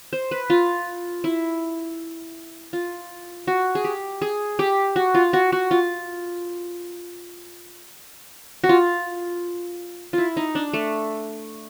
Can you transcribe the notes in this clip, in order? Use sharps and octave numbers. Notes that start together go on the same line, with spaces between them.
C5
B4
F4
E4
F4
F#4
G#4
G4
G#4
G4
F#4
F4
F#4
F#4
F4
F#4
F4
E4 F4
D#4
D4
A3